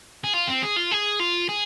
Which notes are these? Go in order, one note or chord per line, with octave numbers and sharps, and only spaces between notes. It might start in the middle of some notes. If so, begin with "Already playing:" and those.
G#4
F4
C4
G#4
F4
G#4
F4
G#4